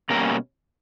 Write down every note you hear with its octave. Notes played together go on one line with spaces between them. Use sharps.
B2 G3 A#3 C#4 A#4